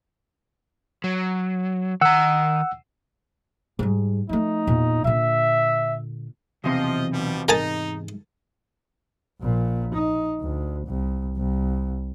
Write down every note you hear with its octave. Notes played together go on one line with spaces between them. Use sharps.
F#3
D#3 F#5 A#5 E6
G#2 G3
F3 A3 D#4
E2 A#2
A#2 D3 E5
B1 E2 C3 E3 F3 D#5 C6
B2 F3 G3
G#2 D#4 A#4 G#5 A5
A#1 A#2
D#4
D2
C2
C2